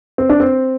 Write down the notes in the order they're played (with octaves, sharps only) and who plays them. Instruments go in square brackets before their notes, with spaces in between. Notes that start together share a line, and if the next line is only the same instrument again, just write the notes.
[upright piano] C4
D4
C4